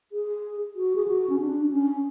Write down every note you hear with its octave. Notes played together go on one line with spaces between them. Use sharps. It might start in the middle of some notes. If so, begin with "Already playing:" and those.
G#4
F#4
G#4
F#4
C#4
D4
C#4